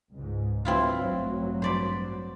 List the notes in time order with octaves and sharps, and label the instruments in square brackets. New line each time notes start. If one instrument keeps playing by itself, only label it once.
[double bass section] C#2 G#2
[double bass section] F#3 [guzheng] C4 E4 F4
[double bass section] A1 G2 F#3
[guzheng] C5 D5 B5